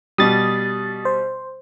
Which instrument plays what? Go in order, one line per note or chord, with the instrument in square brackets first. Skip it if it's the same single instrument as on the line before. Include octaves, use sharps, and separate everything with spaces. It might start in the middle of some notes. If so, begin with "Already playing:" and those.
[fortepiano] B2 G3 [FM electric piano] D#6 A6
[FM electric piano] C5